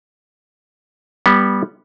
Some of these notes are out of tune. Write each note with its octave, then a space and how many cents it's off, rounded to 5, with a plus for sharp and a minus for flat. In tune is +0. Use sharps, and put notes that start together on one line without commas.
G3 +5 B3 -20